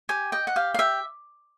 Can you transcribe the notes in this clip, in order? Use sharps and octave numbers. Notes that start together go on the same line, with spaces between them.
G4 G#5
D#5 G5
F#5
G4 F5
F5
G4 E5